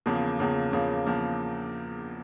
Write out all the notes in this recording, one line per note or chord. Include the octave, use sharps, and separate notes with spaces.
E2 C#3 F3 A#3
E2 C#3 F3 A#3
E2 C#3 F3 A#3
E2 C#3 F3 A#3